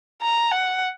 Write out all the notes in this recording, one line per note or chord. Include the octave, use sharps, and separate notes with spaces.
A#5
F#5